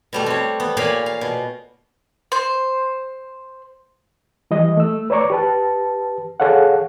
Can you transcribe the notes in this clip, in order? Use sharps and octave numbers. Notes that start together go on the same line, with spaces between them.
B2 G3 A3
C4 C#5
B3
A#2 C#5 D5 F5 G#5 B5
F5
B2
C5
E3 G3 D#5
A3 E6
B4 C#5 D5 A#5 C#6 D6
G4 B4 A5
G#4 A4 C#5 F5 F#5